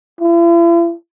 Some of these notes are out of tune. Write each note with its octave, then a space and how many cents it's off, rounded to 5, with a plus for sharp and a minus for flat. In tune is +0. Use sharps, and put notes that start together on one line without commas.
E4 +45